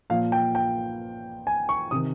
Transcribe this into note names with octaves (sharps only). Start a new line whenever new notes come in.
A#2 F3 F5
G5
G5
G#5
C#6
C3 D#3 D#6